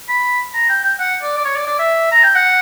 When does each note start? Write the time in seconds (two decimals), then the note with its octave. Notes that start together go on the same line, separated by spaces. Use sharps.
0.08 B5
0.54 A#5
0.69 G5
0.84 G5
1.00 F#5
1.22 D5
1.37 D5
1.45 C#5
1.56 D5
1.67 D5
1.79 E5
2.11 A#5
2.24 G5
2.35 F#5